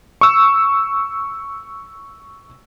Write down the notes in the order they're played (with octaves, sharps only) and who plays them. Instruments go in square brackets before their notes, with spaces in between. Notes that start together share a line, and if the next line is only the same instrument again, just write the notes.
[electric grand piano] C#6 E6